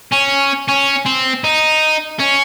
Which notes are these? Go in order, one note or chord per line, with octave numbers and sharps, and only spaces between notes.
C#4
C#4
C4
D#4
C#4